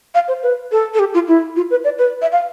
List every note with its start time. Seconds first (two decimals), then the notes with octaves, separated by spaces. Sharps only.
0.15 F5
0.28 C5
0.43 B4
0.72 A4
0.94 A4
0.99 G4
1.14 F4
1.28 E4
1.56 F4
1.71 B4
1.84 D5
1.99 B4
2.22 E5
2.32 F5